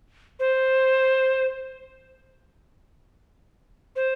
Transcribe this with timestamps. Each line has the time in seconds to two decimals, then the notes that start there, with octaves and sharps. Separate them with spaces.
0.39 C5
3.96 C5